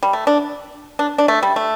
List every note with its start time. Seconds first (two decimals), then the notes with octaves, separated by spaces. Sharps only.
0.03 G3
0.13 A3
0.27 D4
0.99 D4
1.18 D4
1.28 A3
1.43 G3
1.56 A3